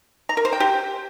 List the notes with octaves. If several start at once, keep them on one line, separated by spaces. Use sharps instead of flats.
A#5
A#4
C5
G5
G4